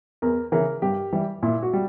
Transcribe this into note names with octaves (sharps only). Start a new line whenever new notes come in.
E2 A#4
C#3 E3 A#4
G2 G4
E3 G3
A#2 E4
F#4
G3